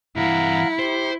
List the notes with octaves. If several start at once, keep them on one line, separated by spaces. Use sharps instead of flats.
G2 E3 E4 F5 F#5 A#5
G4 C5